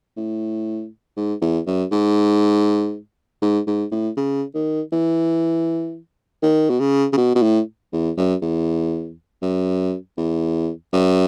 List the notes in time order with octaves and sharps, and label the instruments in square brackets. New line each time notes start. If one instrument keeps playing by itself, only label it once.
[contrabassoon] A2
G#2
E2
F#2
G#2
G#2
G#2
A2
C#3
D#3
E3
D#3
B2
C#3
C#3
B2
B2
A2
E2
F#2
E2
F#2
E2
F#2